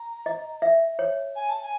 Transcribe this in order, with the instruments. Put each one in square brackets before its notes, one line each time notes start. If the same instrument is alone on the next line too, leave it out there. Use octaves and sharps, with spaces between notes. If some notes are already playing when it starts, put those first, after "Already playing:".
Already playing: [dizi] A#5
[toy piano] D#5
E5
C#5
[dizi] G#5
A5
G#5